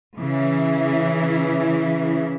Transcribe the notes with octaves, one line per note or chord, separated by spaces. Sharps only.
C#3 E3 E4